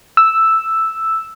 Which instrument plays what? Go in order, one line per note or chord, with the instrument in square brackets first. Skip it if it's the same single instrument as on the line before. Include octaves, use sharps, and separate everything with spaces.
[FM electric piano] E6